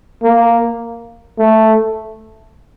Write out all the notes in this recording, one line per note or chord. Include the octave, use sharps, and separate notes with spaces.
A#3
A3